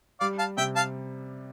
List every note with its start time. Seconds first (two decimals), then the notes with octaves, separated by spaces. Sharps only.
0.20 G3 D5 F5
0.38 F5 A5
0.57 C3 E5 G5
0.75 F5 A5